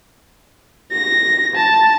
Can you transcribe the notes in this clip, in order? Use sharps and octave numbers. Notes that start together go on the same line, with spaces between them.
A#6
A5